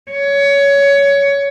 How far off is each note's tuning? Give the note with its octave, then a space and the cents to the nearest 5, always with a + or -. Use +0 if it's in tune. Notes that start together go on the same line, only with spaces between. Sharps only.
C#5 +20